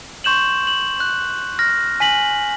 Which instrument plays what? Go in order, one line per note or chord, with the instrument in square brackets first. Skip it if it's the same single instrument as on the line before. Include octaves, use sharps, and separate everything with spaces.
[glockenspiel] C6 C#6 G6 E7 F#7
F#7
F#6
F6 A#6
G#5 B6 F#7